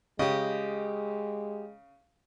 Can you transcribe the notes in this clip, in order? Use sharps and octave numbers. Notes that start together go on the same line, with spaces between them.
C#3 G#3 G4 D#5